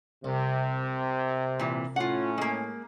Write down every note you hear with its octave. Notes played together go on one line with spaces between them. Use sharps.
C2 C3
A#2 E3
A2 C#4 F4 F#5
G#3 A#3